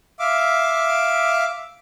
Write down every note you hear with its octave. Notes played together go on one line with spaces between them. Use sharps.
E5 F5 D6